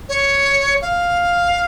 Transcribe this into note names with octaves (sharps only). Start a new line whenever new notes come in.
C#5
F5